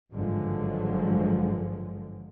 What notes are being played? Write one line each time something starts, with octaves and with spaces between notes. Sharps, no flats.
G#1 G2 D3 F3 F#3 G#3